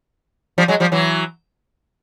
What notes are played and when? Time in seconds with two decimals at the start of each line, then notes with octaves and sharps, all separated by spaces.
0.58 F3 G3
0.68 F#3 G#3
0.80 F3 G3
0.92 E3 F#3